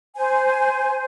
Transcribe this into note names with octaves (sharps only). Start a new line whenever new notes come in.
C5 G#5